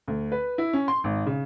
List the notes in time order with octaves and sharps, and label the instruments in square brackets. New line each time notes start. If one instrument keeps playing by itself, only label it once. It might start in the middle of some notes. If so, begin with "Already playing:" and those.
[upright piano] D2
B4
E4
C#4
C6
G#1
C#3